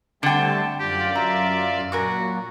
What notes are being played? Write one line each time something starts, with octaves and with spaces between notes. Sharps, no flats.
D3 G3 A3 C4 F#5 G5 A5
F#2 F4 G4 D5
E5 A#5
A#2 F#3 F#4 A#4 G#5 D6